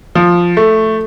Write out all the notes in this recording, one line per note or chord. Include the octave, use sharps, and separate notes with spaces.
F3
A3